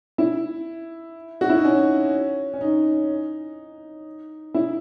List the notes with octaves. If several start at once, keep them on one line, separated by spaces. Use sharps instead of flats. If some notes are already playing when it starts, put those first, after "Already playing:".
E4
F#4
E4
D#4
C#4
C#4
D#4
E4